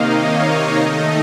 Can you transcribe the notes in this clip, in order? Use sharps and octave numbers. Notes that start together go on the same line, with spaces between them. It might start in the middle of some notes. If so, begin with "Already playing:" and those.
Already playing: C3 D#3 A#3 D#4 D#5 F5
C#5
D#3 A3 D#4 D#5